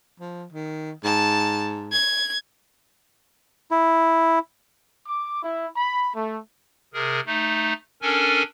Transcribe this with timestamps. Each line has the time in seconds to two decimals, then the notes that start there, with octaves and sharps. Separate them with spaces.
0.20 F3
0.53 D#3
1.04 G#2 A5
1.92 G#6
3.71 E4
5.06 D6
5.42 E4
5.76 B5
6.16 A3
6.94 C3 G#4 A#4
7.26 A3 D#4
8.02 C#4 D4 A4 A#4 G#5